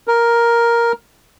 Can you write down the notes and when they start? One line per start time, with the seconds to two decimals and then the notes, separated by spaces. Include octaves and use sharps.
0.07 A#4